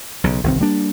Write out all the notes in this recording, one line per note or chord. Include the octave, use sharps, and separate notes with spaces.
B1 C#3
G1 C2 D#3 C4
G3 A#3 D4